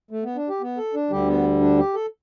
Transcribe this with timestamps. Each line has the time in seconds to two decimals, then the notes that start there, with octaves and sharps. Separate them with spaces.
0.11 A3
0.24 B3
0.36 D4
0.49 G4
0.61 B3
0.78 A4
0.94 D4
1.10 D2 D3 G3 G4
1.28 B3
1.61 D4
1.78 G4
1.94 A4